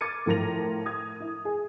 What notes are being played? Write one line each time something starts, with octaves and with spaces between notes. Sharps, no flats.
D6 F6 G#6 A6 C#7 D#7
A2 F3 A#4 A#6 F7
D#6 G#6
E4
G#4